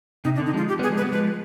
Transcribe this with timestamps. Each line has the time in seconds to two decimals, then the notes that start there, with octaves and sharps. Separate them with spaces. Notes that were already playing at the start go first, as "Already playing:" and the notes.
0.24 C3 D#4
0.36 D4
0.39 D3
0.46 D#4
0.54 F3 G#3 F4
0.69 G4
0.79 G3 B3
0.83 G#4
0.90 F3 G#3
0.98 B4
1.01 G3 B3
1.12 F3 G#3 B4